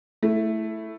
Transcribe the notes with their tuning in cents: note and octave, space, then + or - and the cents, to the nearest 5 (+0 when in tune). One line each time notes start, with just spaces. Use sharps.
A3 +0 E4 +0